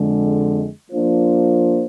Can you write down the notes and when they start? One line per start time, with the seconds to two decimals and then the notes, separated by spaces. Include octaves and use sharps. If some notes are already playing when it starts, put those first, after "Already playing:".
Already playing: F2 D3 G#3
0.92 F3 A#3 D4 F4 C5